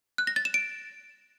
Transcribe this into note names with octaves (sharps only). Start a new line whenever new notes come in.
F#6
A#6
A6
E7
D7